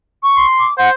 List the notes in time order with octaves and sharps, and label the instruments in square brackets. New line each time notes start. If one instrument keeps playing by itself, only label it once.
[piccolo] C#6
[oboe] C6
[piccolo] D6
[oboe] C5 [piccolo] F#5